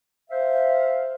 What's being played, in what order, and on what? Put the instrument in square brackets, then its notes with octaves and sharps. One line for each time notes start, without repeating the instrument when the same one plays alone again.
[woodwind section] C5 E5 F5